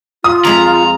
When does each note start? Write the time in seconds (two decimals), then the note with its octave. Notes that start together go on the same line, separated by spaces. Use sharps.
0.24 F4 D#6
0.45 F2 G#3 A#5 B5